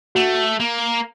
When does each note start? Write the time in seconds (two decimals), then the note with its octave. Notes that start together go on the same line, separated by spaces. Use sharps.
0.15 A3 F#4
0.60 A#3